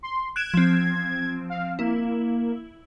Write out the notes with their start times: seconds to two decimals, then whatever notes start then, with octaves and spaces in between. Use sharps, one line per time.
0.03 C6
0.36 F#6 G#6 D7 E7
0.54 F3 C4
1.50 F5
1.79 A#3 E4